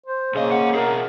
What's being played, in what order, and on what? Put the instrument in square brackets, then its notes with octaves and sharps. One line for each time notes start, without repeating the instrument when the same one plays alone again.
[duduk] C5
[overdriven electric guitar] B1 D#5 [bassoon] C#3 [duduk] A#3
[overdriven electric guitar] A#4 F#5
[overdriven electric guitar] B2 G#4 [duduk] A#4